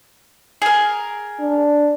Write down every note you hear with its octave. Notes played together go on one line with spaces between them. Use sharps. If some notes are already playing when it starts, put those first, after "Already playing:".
G#4 A#4
D4